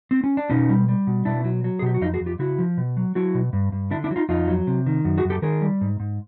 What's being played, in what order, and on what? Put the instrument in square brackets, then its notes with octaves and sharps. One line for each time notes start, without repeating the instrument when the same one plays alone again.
[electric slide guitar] C4
C#4
D4
B2 C#4 D#4
G3
G3
B2
B2 D4 E4
F#3
F#3
G#4
B2 G4
F#4
F2 D#4 F4
F#4 G#4
F2
F4 G4
C#3 E4 F#4
F3
B2
F#3
F#3 E4 F#4
B2
G2
G2
D3 D4 E4
D4 E4
F#3
D#4 F4
F2 D#4 F4
F#3
C3
D#3
F#2
F#4 G#4
F#2
G4 A4
D#3 G#4 A#4
G3
G#2
G#2